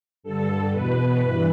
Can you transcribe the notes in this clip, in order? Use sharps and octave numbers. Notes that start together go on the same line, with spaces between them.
G2 D3 A4
E2 B2 B4
G2 E3